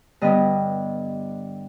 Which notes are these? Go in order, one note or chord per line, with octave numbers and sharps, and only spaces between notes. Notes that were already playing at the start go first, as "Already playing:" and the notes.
G2 D3 G3 B3 D#5